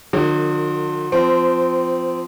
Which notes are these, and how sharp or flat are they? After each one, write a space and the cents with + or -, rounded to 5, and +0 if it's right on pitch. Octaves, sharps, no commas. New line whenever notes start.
D3 +45 F#3 -45 A#4 -35
F3 +0 C4 -20